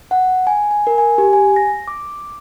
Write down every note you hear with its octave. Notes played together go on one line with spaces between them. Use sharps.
F#5
G#5
G#5
A#4
G#5
G4
G#5
A#6
D6